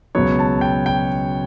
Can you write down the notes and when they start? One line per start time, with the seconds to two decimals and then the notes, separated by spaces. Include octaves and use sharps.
0.15 C#2 B2 F#3 B3 C#5
0.39 A5
0.61 G5
0.86 G5